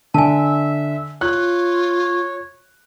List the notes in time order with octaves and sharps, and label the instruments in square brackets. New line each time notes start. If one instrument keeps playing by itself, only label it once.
[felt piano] D3 [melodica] E5 [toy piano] G#5 A5
[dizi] F4 [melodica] C#5 [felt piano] F#6